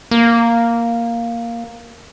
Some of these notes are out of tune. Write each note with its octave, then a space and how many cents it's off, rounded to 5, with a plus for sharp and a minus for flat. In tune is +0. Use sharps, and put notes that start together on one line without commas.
A#3 +0